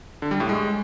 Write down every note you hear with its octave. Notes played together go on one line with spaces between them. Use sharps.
D3
G3
A2
G#3